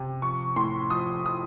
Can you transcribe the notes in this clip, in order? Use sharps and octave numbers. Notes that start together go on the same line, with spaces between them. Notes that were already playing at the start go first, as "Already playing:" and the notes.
Already playing: C3
F3 C#6
A2 C6
F3 D#6
F3 D#6